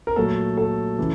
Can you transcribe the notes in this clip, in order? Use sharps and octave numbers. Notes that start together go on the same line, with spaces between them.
A#4
A#2 F#3 A3 A4
A4
C#3 E3